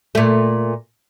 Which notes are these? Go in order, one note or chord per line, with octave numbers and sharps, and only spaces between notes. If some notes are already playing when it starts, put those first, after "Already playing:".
A#2 A3